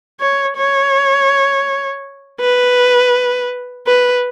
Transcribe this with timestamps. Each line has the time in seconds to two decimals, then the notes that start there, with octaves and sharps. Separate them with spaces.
0.20 C#5
0.57 C#5
2.41 B4
3.87 B4